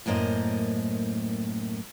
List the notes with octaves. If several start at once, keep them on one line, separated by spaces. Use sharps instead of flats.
F#2 A2 A#3 C5 D#5